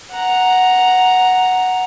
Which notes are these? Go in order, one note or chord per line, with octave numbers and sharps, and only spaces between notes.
F#5 A#5